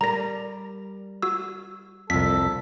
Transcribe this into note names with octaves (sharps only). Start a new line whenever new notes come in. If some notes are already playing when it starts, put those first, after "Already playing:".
G3 A#4 D5 A#5 A#6
F#4 E6
C2 F2 A4 B6